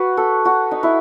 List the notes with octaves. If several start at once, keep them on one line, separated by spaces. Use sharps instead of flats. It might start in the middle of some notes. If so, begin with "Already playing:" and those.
Already playing: F#4 B4
A4
F#4
D#4
E4